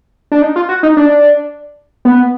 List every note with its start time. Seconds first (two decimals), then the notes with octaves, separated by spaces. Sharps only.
0.32 D4
0.42 D#4
0.56 F4
0.69 F#4
0.83 D#4
0.97 D4
2.05 B3